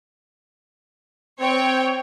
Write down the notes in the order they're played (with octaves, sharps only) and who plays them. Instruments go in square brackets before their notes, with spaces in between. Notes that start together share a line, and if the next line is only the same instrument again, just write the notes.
[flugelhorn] C4 [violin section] C#5 G5